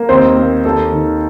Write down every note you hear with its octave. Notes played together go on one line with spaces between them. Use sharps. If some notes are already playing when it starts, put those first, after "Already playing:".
Already playing: A#3
D#2 C4 C5
A#3
D#2 A4
D#3